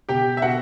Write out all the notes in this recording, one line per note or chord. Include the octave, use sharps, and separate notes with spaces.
B2 G4 G5
E5
B2 F#4 F#5